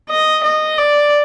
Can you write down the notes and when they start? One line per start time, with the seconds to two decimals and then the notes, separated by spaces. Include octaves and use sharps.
0.10 D#5
0.44 D#5
0.78 D5